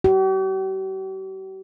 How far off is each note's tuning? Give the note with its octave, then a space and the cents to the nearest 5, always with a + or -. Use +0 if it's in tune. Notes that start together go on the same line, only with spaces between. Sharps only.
G4 -45